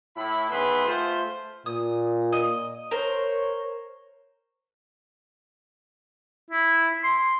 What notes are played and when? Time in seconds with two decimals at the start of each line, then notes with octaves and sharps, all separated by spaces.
0.16 A2 E4 B5
0.50 D#3 B3 G#4 B4 E5 C6
0.86 A3 F4 C5
1.66 A#2 D#6
2.33 D#5
2.91 A#4 C5 C#5
6.51 E4
7.03 C6